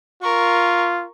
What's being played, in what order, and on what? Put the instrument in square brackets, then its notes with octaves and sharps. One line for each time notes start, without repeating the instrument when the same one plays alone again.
[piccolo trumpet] F4 [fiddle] A#4 C#6